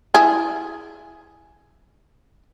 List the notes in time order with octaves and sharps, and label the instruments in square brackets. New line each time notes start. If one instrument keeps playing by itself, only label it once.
[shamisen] E4 G#4